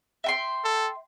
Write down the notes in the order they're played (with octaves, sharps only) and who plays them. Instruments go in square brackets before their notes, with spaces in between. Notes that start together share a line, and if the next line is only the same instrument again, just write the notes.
[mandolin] E5 G5 C6
[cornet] A4